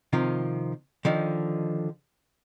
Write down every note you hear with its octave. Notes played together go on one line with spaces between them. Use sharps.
C3 D#3 F3
D3 D#3 F3